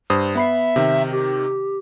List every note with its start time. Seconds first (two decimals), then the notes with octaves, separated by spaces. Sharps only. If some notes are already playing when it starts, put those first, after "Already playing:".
0.10 G2 C5 D#6
0.35 B3 E5 B5 C7
0.76 C3 D#3
1.12 G4